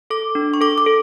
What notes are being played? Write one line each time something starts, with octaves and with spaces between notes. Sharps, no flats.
A4 D6
D4
C#6
A4 D6
D6
A4